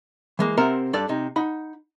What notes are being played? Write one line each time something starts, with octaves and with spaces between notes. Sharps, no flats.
E3 G#3 A#3
C3 C4 A#4 E5 F#5 A#5
G2 D4 A4 D5
C3 D#4
D#4 F#5 B5